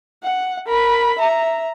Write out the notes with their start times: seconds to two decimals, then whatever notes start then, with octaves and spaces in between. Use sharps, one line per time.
0.23 F#5
0.67 A#4 B5
1.19 E5 A#5